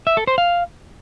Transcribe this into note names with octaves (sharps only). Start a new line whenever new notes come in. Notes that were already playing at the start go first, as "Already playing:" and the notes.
E5
A4
C5
F5